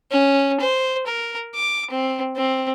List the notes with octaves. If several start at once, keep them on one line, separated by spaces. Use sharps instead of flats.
C#4
C5
A#4
D6
C4
C4